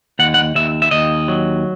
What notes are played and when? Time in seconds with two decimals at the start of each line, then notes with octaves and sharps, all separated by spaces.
0.19 D#2 F#5
0.34 F#5
0.55 D#2 E5
0.82 E5
0.91 D#2 D#5
1.28 F#3